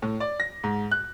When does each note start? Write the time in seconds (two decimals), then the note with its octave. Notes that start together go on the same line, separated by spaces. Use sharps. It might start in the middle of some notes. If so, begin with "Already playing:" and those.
0.02 A2
0.20 D5
0.40 A#6
0.64 G#2
0.91 F#6